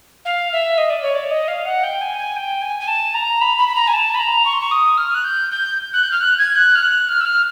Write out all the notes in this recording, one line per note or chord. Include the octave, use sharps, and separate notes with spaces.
F5
E5
D#5
D5
C#5
D5
D#5
F5
F#5
G5
G#5
G#5
G5
G#5
G#5
A5
A#5
B5
B5
B5
A#5
G#5
A5
B5
A#5
C#6
C6
C#6
D#6
F6
F#6
G6
G6
F#6
G6
F6
F#6
G#6
F#6
F6
F#6
F6
E6
F6